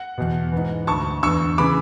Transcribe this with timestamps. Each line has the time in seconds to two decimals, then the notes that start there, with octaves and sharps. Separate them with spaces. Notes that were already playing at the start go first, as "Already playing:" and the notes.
Already playing: F#5
0.18 E2 B2
0.52 G#2 E3
0.87 D2 D3 A5 C#6
1.23 E2 D3 C#6 E6
1.58 C#3 E3 B5 D6